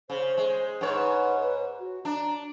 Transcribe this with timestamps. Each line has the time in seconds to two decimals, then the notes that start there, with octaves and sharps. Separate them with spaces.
0.10 C#3 C5
0.37 G#3
0.81 G#2 B4 C#5
1.80 F#4
2.05 D4 A#5